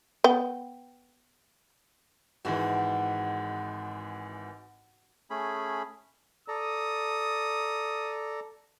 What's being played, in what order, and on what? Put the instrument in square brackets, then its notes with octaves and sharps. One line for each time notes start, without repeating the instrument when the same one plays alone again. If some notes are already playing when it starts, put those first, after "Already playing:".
[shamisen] B3 G5
[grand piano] G#1 G#2 E3 [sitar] F#4
[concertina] A3 C#4 G#4 B5
[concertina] A4 D5 A#5 [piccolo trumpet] D#6